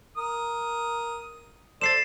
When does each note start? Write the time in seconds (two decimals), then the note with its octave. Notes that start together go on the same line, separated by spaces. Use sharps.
0.17 A#4 D#6
1.81 A4 C5 D5 A6 C7 E7